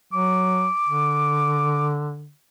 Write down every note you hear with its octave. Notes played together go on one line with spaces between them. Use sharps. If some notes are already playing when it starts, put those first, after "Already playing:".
F#3 D6
D3